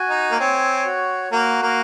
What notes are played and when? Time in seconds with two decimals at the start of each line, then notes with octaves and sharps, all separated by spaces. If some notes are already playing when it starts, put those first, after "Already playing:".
Already playing: F#4 G#5
0.09 D#4
0.31 A#3
0.40 C4 C#5
0.85 F#4
1.32 A#3 F#4
1.62 A#3